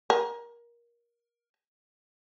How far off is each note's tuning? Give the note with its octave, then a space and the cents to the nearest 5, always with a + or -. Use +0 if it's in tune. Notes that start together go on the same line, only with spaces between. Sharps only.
A#4 +20